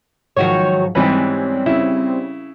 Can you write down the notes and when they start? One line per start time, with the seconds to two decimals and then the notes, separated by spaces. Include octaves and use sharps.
0.37 G#2 D#3 F3 F#3 F#4 C#5
0.95 G#2 E3 G3 C4 C#4 B4
1.66 C#3 E4